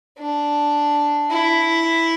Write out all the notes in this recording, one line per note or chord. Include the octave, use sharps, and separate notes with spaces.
D4
E4